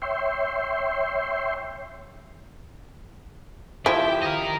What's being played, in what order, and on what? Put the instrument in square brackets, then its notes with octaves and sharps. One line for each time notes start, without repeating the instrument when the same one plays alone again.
[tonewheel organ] C#5 E5 G5 C6
[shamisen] F3 [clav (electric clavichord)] E4 [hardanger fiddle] G4 E5 [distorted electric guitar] G5
[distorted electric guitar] A#4 D#5